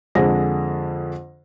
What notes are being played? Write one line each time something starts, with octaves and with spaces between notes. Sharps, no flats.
F2 D3 G#3 A#6